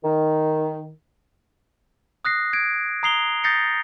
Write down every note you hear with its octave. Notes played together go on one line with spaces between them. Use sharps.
D#3
D#6 F#6 A#6 C7
G#6 D7
A#5 D#6 C7 F7 G7
D#6 G6 A6 A#6 C7 C#7